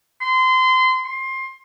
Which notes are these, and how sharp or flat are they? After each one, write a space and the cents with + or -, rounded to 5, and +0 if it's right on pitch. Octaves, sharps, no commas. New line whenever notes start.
C6 -25
C6 +20